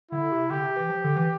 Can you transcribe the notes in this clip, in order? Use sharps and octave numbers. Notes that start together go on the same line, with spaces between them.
D3 E4
C3
D3 G4
C3
E3
F3
D3
E3